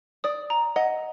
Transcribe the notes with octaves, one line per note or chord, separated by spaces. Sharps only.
D5 D#6
A#5
D#5 F#5